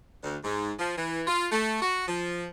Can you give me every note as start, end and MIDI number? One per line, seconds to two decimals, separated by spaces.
0.23 0.37 38
0.43 0.72 44
0.79 0.95 53
0.97 1.23 52
1.27 1.46 65
1.51 1.80 57
1.82 2.03 66
2.08 2.45 53